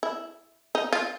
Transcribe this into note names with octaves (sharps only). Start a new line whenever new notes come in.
E4
D#4
F4